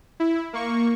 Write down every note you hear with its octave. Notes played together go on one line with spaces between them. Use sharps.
E4
A#3 C#6